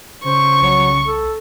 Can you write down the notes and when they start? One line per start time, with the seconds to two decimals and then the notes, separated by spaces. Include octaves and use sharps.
0.24 C#3 C5 C#6
0.62 C2 F#3
1.06 A4